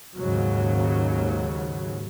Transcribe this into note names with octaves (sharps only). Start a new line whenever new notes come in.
D#2 G#2 C#3 F#3